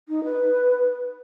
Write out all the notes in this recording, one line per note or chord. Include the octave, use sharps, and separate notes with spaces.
D#4
B4